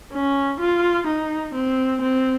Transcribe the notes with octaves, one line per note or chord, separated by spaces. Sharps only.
C#4
F4
D#4
C4
C4